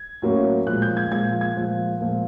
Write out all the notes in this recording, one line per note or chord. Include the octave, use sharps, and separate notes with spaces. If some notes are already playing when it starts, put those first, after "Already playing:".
Already playing: G#6
A2 F#3 A#3 C#4
A#2 F3 G#3 F#6
G6
G#6
A#2 F3 G#3 G#6
G#6
A#2 F3 G#3
A#2 F3 G#3